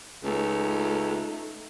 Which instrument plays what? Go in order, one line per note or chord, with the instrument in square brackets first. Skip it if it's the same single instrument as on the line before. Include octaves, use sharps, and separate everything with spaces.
[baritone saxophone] C#2 [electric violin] A3 D#4